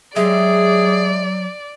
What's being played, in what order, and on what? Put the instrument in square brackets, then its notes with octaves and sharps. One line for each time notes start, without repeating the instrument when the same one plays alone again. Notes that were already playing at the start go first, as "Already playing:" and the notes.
[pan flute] F#3 [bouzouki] G#3 G4 E5 [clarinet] G#4 [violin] D5